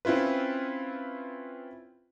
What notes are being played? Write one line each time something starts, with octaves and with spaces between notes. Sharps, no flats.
C4 C#4 E4 F4 B4